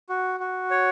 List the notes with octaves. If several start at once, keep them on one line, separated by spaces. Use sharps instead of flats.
F#4
F#4
C#5